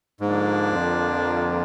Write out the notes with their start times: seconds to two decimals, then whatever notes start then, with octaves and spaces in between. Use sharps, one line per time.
0.20 G#2 D3 F3 A#3 D4
0.72 F2